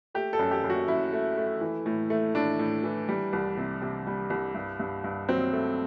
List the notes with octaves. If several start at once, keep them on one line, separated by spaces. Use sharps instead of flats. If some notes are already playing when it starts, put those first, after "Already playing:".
A3 G4
A4
F#2
G4
F#2
F#4
F#2 E4
A3
A3
E3
A2
A3
A2 D4
A2
E3
G3
C2
C3
C3
G3
C2
G2
G2
G2
F#3 C4
A3